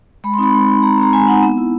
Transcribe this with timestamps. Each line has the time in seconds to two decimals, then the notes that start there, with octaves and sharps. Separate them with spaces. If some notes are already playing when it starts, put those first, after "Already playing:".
0.24 G#3 B5
0.34 C6
0.38 C4 D#4 B5
0.54 G#3
0.69 C4 D#4
0.82 G#3 A#5
0.97 C4 D#4 A#5
1.13 G#3 G#5
1.27 C4 D#4 F#5
1.43 B3
1.58 E4